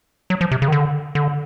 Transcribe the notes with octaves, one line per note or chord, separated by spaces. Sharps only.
F#3
F3
C3
C#3
D#3
D3
D3